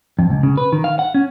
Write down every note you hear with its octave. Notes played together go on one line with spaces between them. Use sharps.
F2
C#2
C#3
B4
D#3
F5
F#5
C#4